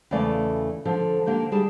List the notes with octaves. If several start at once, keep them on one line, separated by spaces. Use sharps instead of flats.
E2 C#3 E3 A3 D5 F5
D3 F3 A4
D3 A#3 G4 C5
G3 G4 G#4 A5